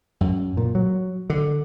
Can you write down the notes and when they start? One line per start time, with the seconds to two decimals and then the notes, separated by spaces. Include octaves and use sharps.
0.21 F#2
0.57 A#2
0.75 F#3
1.30 D3